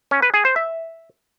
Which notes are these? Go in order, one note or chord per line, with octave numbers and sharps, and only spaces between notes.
C#4
B4
G#4
C5
E5